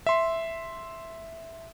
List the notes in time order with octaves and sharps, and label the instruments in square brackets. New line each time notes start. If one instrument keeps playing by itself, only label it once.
[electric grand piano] E5 C6